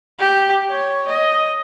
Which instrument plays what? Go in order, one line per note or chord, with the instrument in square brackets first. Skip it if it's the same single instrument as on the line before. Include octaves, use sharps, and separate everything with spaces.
[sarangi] G4
C#5
D#5